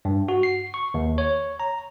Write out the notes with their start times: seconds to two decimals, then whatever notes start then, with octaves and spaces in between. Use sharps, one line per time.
0.05 G2
0.28 F#4
0.43 C7
0.74 C#6
0.94 D#2
1.18 C#5
1.60 A#5